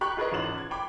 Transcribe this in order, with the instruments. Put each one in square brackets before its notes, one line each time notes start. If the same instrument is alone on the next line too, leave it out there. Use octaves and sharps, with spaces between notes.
[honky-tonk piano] G4 A#5 B5 C#6 F#6
F4 G#4 A#4 B4 D#5
G#1 E2 C#4 F4 E7 F#7
G#6
G5 B5 D6